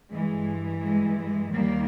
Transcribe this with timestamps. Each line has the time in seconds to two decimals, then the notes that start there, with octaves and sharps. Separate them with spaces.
0.11 G2 E3 G#3
0.82 G#3
1.18 G#3
1.52 D#2 D#3 G3 A#3